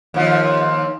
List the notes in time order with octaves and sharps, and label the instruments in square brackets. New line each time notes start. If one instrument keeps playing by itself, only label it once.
[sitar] D#2 F3